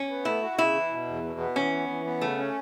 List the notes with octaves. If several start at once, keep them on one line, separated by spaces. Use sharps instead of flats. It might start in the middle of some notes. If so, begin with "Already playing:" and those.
Already playing: C#4
B3
A3 E4
F#4
C#3 E4
E3
B2
E2
B2
B3
E3 C#4
B3
E3
B3
C#3 A3
C#4